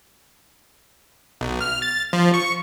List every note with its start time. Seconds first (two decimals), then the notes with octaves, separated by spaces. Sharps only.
1.41 B1
1.61 F6
1.82 A6
2.13 F3
2.34 C#6